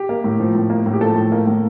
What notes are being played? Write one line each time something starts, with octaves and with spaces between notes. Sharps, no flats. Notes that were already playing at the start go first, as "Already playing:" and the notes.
Already playing: G4
A#3
A2
F3
A2
A#3
A2
G4
F3 A4
A2
A#3
A2